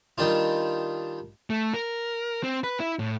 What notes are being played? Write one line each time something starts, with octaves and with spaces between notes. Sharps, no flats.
D#3 G3 D4 F4
A3
A#4
C4
B4
E4
A2